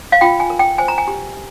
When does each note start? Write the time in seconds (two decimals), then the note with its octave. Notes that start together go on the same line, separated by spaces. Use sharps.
0.12 F5
0.21 F4 G5
0.40 G#5
0.50 A#4
0.59 G5
0.78 C5 G#5
0.88 A#5
0.98 G#5
1.08 G4